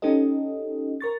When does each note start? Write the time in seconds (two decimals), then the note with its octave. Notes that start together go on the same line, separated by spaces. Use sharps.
0.02 C#4 D#4 G4 A4 D#5
1.01 A#4 C#6 A6